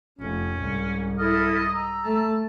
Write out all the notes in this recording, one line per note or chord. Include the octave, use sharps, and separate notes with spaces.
F1 C#4
C2 G#2
E4 A4 D#5 F6
A#5 E6
A3 A5